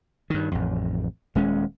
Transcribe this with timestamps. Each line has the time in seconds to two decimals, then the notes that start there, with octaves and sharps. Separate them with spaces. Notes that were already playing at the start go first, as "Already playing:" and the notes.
0.30 G2 D#3
0.51 A1 F2
1.35 D#1 G#3 C#4